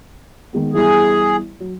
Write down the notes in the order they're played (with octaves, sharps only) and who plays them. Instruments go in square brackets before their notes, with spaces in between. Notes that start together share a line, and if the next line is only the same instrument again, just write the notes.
[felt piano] D#3 G#3 B3
[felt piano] G2 E3 B3 [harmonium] G#4
[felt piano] F#3